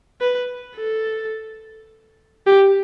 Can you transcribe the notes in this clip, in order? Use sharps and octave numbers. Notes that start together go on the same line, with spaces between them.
B4
A4
G4